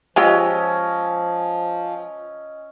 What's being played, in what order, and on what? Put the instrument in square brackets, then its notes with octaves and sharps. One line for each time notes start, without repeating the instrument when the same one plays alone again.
[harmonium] F3 [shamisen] G#3 F4 G4 [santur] C#4 D#5 E6 [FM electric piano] G#5